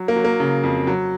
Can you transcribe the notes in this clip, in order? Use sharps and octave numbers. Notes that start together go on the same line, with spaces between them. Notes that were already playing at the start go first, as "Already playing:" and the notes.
Already playing: F#3
A#3
F#3
A#3
C#3
F2
F#3